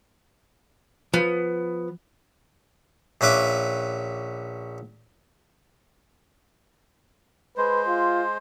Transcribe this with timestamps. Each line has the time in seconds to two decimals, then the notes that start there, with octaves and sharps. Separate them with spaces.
1.14 F3 B3
3.21 A#1 C#4 B4 E5 D6
7.57 G#3 B4 C5
7.88 F4